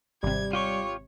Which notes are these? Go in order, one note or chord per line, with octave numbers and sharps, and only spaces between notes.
G#1 C3 G3 G#6
F4 G4 C#5 C#6